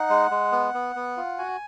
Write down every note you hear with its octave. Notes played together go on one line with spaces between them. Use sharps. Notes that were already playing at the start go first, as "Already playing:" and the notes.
Already playing: D#4 F#5
G#3
G#3
B3
B3
B3
F4
F#4 G#5